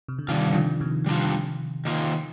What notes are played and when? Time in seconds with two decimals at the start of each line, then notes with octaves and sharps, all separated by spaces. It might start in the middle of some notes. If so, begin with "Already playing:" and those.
0.08 C3
0.19 D3
0.28 C3 D#3 G3 D4 F4
0.54 D3 F3
0.81 C3 D#3
1.06 G3 D4 F4
1.85 D#3 A#3 F4